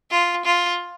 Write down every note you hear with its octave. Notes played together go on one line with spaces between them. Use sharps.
F4
F4